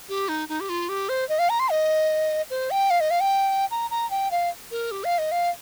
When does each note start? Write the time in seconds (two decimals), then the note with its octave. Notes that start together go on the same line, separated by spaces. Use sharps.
0.09 G4
0.29 D#4
0.49 D#4
0.60 G4
0.69 F4
0.89 G4
1.09 C5
1.29 D#5
1.39 F5
1.50 A#5
1.60 C6
1.70 D#5
2.50 C5
2.71 G5
2.90 F5
3.00 D#5
3.11 F5
3.20 G5
3.71 A#5
3.91 A#5
4.11 G5
4.31 F5
4.71 A#4
4.91 G4
5.04 F5
5.18 D#5
5.32 F5